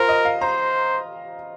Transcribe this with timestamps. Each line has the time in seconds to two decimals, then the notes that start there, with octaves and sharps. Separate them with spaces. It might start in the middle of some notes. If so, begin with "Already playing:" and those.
Already playing: F4 A#4 C5
0.09 D#5
0.25 F5
0.41 C5 A#5